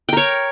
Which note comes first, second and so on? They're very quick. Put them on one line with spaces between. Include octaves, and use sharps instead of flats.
G5 A#4 C#5